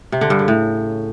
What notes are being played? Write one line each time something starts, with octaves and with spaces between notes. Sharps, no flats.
C3
D3
G2
C#3
A2